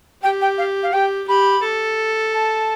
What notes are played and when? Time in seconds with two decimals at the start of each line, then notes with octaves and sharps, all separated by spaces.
0.23 G4 G5
0.41 G5
0.58 F5
0.83 F5
0.92 G4 G5
1.28 G4 B5
1.63 A4
2.33 A5